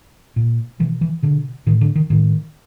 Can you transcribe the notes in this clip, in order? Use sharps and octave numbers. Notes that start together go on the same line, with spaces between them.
A#2
B2 E3
E3
B2 D3
A2 D#3
D3
D#3
A2 D#3